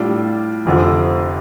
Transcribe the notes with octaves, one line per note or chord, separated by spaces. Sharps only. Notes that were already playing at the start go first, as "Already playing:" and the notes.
Already playing: A2 G3 D4 F4
F1 F2 D3 F3